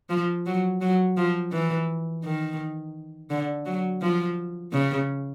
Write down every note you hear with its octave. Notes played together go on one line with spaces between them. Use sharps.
F3
F#3
F#3
F3
E3
D#3
D3
F#3
F3
C#3